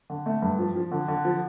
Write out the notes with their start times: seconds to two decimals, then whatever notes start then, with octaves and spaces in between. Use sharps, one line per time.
0.10 D3
0.26 A3
0.42 G2
0.59 F3
0.75 F3
0.92 D3
1.08 D3
1.25 F3